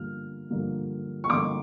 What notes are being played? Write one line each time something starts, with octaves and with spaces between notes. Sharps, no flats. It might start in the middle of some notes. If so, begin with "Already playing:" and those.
Already playing: G2 D3 F3 A#3 F6
G2 D3 F3 A#3
C#6
G2 D3 F3 A#3 C6 D6